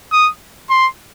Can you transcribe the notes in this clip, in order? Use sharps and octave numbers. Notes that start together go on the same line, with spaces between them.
D#6
C6